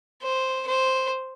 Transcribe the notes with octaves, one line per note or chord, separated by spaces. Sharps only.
C5
C5